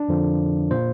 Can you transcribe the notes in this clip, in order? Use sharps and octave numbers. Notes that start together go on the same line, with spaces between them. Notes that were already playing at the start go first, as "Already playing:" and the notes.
Already playing: D4
F2 D3 F3
A#2 A#3 C5